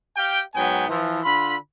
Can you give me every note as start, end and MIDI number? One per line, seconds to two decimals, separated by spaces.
0.17 0.40 67
0.17 0.40 77
0.17 0.40 79
0.54 0.86 44
0.54 0.86 54
0.54 0.86 59
0.54 0.86 79
0.54 0.86 80
0.88 1.19 52
0.88 1.19 53
1.24 1.55 50
1.24 1.55 65
1.24 1.55 83